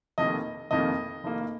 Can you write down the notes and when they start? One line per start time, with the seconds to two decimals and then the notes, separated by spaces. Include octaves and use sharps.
0.18 F1 F2 D#3 A#3 D#5
0.71 F1 F2 D#3 A#3 D#5
1.24 F1 F2 D#3 A#3